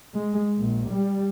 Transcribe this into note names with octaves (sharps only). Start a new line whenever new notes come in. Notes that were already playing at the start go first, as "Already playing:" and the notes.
G#3
A#1
G3